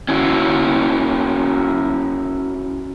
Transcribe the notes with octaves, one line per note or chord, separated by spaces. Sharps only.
C#4 E4 F#4